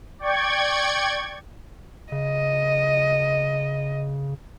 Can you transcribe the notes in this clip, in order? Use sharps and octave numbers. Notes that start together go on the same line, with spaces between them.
D5 G5 C#6 G#6
C#3 D#5